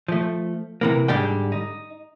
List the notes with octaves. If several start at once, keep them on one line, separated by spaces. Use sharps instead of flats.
F3 A3
C3 E3 A#3
G#2 D3 G3 D5 G5
D#4